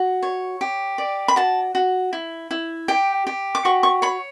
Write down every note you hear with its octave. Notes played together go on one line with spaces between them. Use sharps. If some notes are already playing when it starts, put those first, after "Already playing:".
Already playing: F#4
C#5
G4
D5
B5
F#4 A5
F#4
E4
E4
G4 G5
G4
D6
F#4 C#6
C#6
C#5 B5